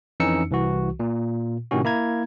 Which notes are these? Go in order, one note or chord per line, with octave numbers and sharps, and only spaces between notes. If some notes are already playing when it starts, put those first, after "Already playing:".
F2 E3 C#4 D#4 E6 C#7
C2 E3 F#4
A#2
A2 C3 D#3 C#4 F#4
A#3 E4 A#5 G#6